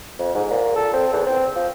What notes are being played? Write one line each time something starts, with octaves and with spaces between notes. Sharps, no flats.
F2
G#2
A#2
A4
C4
E2
C4
F3